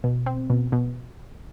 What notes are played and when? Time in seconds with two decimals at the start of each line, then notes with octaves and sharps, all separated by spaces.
0.04 B2
0.26 C4
0.50 B2
0.72 B2